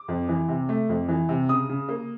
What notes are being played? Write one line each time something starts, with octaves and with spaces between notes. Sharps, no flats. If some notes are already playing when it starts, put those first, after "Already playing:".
Already playing: D6
F2
E3
C3
A3
F2
E3
C3
C#3 D#6
C#3
A#3